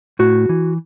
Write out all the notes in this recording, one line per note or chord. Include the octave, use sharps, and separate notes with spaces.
A2 F#4
E3